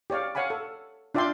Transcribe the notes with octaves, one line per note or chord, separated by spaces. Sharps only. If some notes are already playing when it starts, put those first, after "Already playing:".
G4 C#5 D5 F5
C#5 F5 F#5 G#5 B5
A4
D4 F4 D5 E5 G5 C6